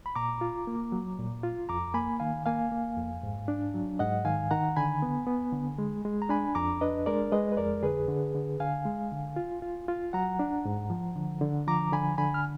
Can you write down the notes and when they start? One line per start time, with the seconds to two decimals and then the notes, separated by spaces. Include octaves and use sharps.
0.06 B5
0.15 A#2 A#5 D6
0.41 F4
0.67 A#3
0.92 F#3
1.18 A#2
1.43 F4
1.69 F2 A#5 D6
1.94 A#3 G#5 B5
2.20 D#3 F5 G#5
2.46 A#3 F5 G#5
2.72 A#3
2.96 F2
3.23 G#2
3.48 D4
3.74 F#3
3.99 G#2 D#5 F#5
4.25 D#3 F5 G#5
4.51 D#3 F#5 A#5
4.76 D3 G#5 B5
5.02 B3
5.27 B3
5.53 D3
5.78 G#3
6.05 G#3
6.22 A#5
6.29 D4 G#5 B5
6.55 F2 A#5 D6
6.81 D4 B4 D#5
7.06 G#3 A#4 D5
7.32 G#3 B4 D#5
7.52 B4
7.57 F2 A#4 D5
7.83 D3 G#4 B4
8.08 D3
8.35 D3
8.60 D3 F5 G#5
8.86 G#3
9.12 D3
9.36 F4
9.62 F4
9.88 F4
10.13 F#3 F#5 A#5
10.39 D4
10.65 G#2
10.90 F3
11.15 D3
11.41 D3
11.67 F3 A#5 D6
11.93 D3 G#5 B5
12.18 D3 G#5 B5
12.34 F6